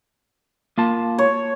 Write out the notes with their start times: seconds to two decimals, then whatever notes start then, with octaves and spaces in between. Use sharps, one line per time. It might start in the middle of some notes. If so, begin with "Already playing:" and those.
0.78 A#3 F4 A5
1.18 C#5